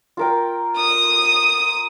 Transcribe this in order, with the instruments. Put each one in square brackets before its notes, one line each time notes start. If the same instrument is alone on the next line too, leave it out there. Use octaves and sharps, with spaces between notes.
[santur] F4 A#4 G5
[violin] D#6